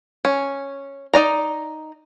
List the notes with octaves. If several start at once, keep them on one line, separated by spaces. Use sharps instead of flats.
C#4
D#4 D5 A#5